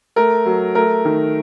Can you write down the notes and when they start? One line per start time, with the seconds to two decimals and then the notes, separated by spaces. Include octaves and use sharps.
0.16 A3 A#4
0.46 F#3
0.75 A3 A#4
1.05 D#3